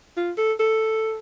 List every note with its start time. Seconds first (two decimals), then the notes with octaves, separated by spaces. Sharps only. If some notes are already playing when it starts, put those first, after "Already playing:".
0.17 F4
0.38 A4
0.60 A4